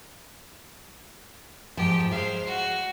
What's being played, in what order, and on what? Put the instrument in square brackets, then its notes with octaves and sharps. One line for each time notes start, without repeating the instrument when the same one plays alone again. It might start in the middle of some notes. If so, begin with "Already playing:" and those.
[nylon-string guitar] G#2 F3 [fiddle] G4
[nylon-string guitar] G#3 [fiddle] C5 F5
[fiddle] F#4